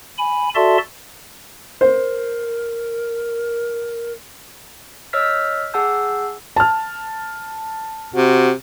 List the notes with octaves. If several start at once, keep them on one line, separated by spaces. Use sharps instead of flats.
G#5 B5
F#4 A4 D5 E5 A5 C6
A#4 C5
C#5 D#5 E6 F6 B6
G#4 F#5 A5 E6 G6
A5 F6
C3 F#4